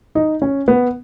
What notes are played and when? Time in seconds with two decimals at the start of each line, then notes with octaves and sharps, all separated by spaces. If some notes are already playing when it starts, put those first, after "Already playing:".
0.15 D#4
0.42 C#4
0.68 B3